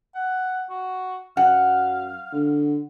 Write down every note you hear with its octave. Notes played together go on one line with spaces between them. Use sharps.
F#5
F#4
F#2 F5 F#5
D3